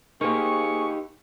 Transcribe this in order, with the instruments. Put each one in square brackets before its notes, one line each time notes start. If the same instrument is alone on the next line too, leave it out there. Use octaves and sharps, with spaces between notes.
[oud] A#3 C4 [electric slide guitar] D#4 G4 [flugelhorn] G#4 [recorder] C#6